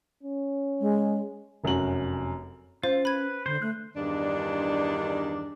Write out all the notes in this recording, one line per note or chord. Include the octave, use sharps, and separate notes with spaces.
C#4
G#3
F1 F#2 C#4 F#4 F#7
C#4 F4 C5
B4 B5 G#6
D3 C5
A3 F#6
E2 G2 D#3 D4